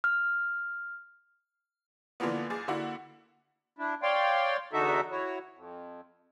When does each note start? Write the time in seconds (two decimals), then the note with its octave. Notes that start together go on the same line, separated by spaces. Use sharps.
0.04 F6
2.20 D3 E3 F3 A#3 B3
2.50 F#1 G#4 D6 A6
2.68 D3 A#3 E4 F#4
3.79 D4 E4
4.03 C#5 D5 F5 G5 C6
4.73 E2 D3 D#4 F#4 A4 E5
5.11 E4 F#4 C#5
5.55 F2